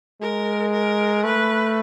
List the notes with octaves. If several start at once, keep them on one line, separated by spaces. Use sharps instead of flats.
G#3 A#4
A#4
A3 B4